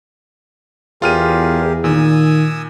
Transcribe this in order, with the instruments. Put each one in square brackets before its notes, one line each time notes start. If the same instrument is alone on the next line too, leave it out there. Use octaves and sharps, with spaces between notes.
[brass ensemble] E2 [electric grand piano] F4 F6 D#7 [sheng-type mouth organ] G4 G#4 A#4
[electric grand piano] A#2 [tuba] D#3 [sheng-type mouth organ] G#5 D#6 E6